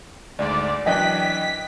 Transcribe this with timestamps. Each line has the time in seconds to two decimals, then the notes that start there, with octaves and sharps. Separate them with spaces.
0.39 D2 G#2 G#3 D5
0.86 E3 F#3 D4 D#5 G5 F#6 B6